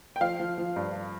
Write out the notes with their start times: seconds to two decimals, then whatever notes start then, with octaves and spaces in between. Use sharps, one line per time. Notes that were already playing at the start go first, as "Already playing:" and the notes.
0.16 G5
0.21 F3 F5
0.40 F3
0.58 F3
0.76 G2